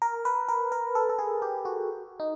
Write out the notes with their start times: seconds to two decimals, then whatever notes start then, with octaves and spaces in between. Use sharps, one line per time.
0.02 A#4
0.25 B4
0.48 A#4
0.72 A#4
0.95 A4
1.09 A4
1.19 G#4
1.42 G4
1.65 F#4
2.20 D#4